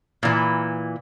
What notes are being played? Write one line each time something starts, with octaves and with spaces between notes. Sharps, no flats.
A#2 E3